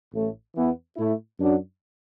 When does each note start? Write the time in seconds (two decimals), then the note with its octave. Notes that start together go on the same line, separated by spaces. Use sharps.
0.12 A1 A2 A3
0.55 E2 E3 B3
0.97 A2 A3 E4
1.39 F#2 F#3 D4 F#4